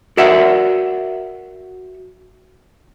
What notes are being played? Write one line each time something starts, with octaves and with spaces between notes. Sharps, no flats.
F#4 A#4 D5 E5 F#5